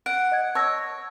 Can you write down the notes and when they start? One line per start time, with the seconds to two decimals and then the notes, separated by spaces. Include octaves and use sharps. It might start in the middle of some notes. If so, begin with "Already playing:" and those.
0.06 F#5 D7
0.32 D#5 G#6
0.55 C#5 A5 E6 A#6
0.67 E6